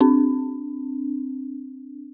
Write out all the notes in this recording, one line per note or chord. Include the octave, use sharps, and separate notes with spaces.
C4 D4